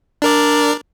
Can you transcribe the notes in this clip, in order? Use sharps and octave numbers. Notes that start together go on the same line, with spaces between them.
D4 A#4 D5